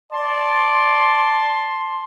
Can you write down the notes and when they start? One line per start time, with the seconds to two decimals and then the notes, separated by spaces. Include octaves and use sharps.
0.12 D5 A5 C6